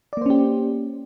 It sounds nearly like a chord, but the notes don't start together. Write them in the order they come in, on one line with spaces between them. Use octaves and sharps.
D5 A#3 C5 C#4 G4